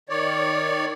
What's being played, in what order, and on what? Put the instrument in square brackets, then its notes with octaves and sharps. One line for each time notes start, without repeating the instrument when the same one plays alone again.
[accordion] D#3 C#5 D5